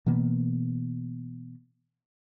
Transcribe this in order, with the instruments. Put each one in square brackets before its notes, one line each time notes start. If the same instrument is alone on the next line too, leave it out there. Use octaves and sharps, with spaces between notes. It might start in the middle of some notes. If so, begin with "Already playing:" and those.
[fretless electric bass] B2 E3 A#3 B3